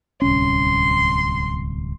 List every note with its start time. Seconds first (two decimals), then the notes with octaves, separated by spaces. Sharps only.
0.22 D1 C2 C#4 C6